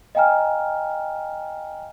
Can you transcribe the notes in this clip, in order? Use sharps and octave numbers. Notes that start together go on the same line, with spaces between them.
D#5 F5 G5 G#5 A#5 F6